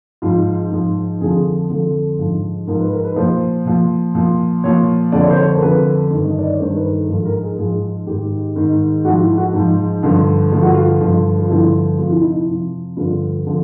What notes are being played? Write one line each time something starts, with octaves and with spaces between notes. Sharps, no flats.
G#2 F3 F4
G#2 F3
F2 D3 F3 G#4
F2 D3 F3 A4
G#2 F3
G#2 F3 A#4
B4
A#4
B4
A#2 F3 C5
A#2 F3
A#2 F3
A#2 F3 C#5
F2 D3 F3 D5
C#5
C5
C#5
A#4
F2 D3 F3 B4
G2 D#3
D#5
D5
C#5
G2 D#3 C5
B4
A#4
A4
G#2 F3 A4
A#4
G#4
G#2 F3 G#4
G#2 D#3 G4
G#2 D#3
G#2 F3 F#4
E4
F#4
G#2 F3
G2 D3 F3
G2 D3 F3 F4
F#4
F4
G2 D3 F3
F4
G2 D3 F3 E4
F2 C3 F3 F4
E4
D#4
E4
F2 C3 F3
G2 D3 F3 F4
D3 F3